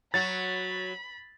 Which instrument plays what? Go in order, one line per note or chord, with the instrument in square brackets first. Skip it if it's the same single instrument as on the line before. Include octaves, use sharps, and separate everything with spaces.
[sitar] F#3 F#4 [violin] B5 [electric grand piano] A6